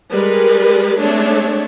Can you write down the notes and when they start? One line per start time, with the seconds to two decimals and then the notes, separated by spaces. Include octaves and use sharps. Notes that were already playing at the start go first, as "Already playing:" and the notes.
0.13 G3 G#3 A#4 B4
1.01 G#3 A3 C4 D4 C#5